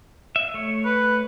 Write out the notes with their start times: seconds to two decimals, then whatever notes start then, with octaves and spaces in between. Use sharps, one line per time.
0.36 E5
0.54 A3 C#5
0.84 B4